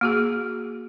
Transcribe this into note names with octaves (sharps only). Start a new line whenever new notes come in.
A#3 F#4 G#4